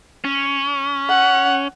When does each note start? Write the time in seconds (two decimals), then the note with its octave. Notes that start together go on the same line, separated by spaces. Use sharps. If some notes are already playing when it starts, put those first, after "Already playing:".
0.24 C#4
1.09 F#5